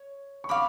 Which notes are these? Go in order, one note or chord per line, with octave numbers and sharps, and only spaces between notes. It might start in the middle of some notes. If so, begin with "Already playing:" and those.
Already playing: C#5
C#6
F5 B5 D6